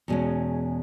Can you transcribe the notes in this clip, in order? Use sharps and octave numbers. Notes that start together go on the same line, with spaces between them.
E2 B2 G#3 C#4